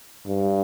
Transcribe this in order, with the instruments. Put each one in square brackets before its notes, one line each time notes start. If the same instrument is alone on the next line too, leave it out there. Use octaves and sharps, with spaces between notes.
[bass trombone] G2